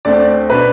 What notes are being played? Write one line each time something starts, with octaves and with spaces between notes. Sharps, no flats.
D2 D3 A3 C4 D5
D5
B2 B3 D4 B4